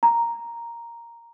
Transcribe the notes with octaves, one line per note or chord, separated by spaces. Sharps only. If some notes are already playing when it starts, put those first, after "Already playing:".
A#5